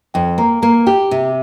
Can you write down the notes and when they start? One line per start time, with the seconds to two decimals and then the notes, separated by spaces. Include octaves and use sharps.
0.14 F2 G5
0.38 A#3 A#5
0.62 A#3 A#5
0.87 G4 G5
1.11 C3